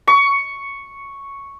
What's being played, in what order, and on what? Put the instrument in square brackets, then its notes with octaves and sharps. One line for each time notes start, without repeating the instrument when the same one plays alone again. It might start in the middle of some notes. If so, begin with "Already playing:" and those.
[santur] C#6